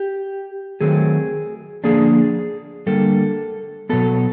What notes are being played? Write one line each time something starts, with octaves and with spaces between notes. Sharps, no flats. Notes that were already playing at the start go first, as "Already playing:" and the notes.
Already playing: G4
D#3 F#3 A3 C4 G#4
D3 F3 A#3 D4 G#4
D3 G3 A#3 A4
B2 F#3 B3 A4